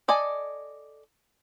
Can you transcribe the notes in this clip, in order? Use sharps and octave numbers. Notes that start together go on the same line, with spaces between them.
A4 D5 D#5 G#5